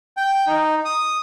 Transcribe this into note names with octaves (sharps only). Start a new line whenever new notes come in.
G5
D#4
D#6